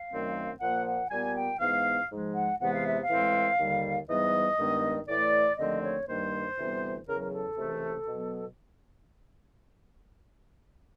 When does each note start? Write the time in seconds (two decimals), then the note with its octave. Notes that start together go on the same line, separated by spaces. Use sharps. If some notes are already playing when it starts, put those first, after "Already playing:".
Already playing: F5
0.11 F#2 D#3 F#3 A3 C4
0.60 A#2 F3 A#3 F#5
0.86 F#5
1.10 A#2 G3 B3 G#5
1.35 G5
1.60 G#2 E3 G#3 B3 F5
2.10 G#2 F3 G#3
2.34 F#5
2.59 E2 C3 E3 G#3 B3 F#5
2.73 F5
2.87 E5
3.01 F5
3.09 A2 E3 G#3 C4
3.59 D#2 D3 G3
4.08 G#2 E3 G3 B3 D#5
4.58 G2 D#3 G#3 B3
5.08 A2 E3 A3 D5
5.57 D#2 D3 F3 A3 C4 D#5
5.83 C#5
6.07 G2 D#3 G3 A#3 C5
6.57 D2 C3 E3 G3 B3
7.07 E2 C#3 F#3 A#4
7.20 A#4
7.32 A4
7.57 C#2 C3 E3 A3
8.06 B2 F#3 B3